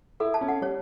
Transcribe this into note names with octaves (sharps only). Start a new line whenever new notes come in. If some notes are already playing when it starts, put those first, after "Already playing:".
E4 A4
A5
C#4
F#5
G3 C#5